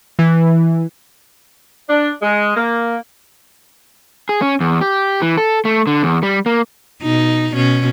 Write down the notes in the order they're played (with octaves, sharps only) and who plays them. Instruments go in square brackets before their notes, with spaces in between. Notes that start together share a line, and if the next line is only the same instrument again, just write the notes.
[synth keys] E3
[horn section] D4
G#3
A#3
[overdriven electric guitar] G#4
C#4
E2
G4
E3
A4
A3
D3
E2
G3
A#3
[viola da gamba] B2 D#4
B2 C#4